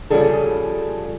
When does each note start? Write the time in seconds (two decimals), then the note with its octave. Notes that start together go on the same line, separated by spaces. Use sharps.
0.10 C#3 E3 F3 G3 G#4 A4